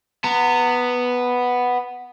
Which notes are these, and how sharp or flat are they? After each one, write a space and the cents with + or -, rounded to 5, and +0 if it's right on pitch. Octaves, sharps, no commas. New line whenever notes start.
B3 +0 A#5 -35